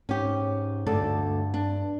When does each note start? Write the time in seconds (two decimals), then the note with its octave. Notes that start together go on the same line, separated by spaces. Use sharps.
0.09 G#2 C#4 G4
0.86 D2 G2 A4 D5
1.54 D4